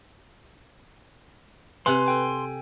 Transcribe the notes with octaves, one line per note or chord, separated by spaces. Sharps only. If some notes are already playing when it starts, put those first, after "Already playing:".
C3 B4 F#5 G#5 C6
A4 G5 G#5